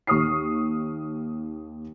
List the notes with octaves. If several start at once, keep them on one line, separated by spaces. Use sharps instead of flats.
D#2 C#6 D#6 F6 C7